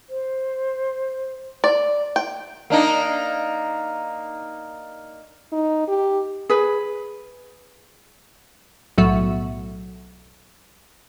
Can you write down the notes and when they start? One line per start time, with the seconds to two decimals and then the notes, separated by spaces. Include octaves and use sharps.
0.10 C5
1.64 D5
2.16 G5
2.70 A#3 D4 D#4
5.52 D#4
5.88 G4
6.49 G#4 B4
8.98 B1 A2 F#3 E5